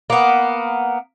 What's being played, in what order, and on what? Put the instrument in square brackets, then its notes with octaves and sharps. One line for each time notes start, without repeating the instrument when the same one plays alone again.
[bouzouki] A#3 B3